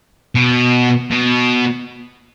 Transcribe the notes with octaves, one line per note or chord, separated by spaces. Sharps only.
B2
B2